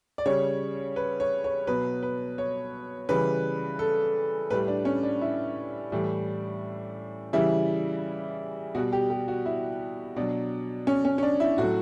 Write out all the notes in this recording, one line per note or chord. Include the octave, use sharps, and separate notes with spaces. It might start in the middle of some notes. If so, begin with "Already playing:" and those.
D5
C#3 G3 C#5
B4
C#5
C#5
B2 F#3 B4
B4
C#5
C#3 E3 G3 B4
A4
A2 G3 B4
D4
C#4
D4
E4
A2 E3 G3
C#3 E3 G3 E4
B2 G3 F#4
G4
G4
F#4
E4
B2 F#3 D4
C#4
C#4
C#4
D4
E4
A2 F#3 F#4